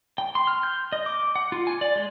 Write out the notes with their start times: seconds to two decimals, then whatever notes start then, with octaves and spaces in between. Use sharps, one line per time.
0.18 G5
0.35 C6
0.47 F6
0.63 G6
0.92 D#5
1.06 D6
1.36 F#5
1.52 F4
1.67 G#5
1.81 D5
1.96 G#3